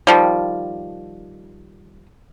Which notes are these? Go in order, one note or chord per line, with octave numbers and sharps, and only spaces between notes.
D#3 F3 G3